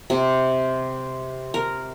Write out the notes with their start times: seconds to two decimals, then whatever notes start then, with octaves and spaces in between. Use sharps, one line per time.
0.10 C3
1.54 A#4